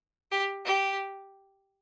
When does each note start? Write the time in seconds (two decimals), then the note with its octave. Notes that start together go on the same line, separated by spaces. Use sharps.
0.31 G4
0.64 G4